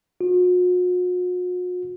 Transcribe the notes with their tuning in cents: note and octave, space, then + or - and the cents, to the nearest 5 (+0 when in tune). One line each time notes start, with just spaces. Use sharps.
F#4 -45